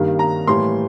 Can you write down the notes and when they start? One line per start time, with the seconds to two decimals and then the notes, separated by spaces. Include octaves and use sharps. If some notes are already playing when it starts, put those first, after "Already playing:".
Already playing: G2 D#3 G3 A#3
0.19 A#5
0.47 A2 E3 G3 A#3 C6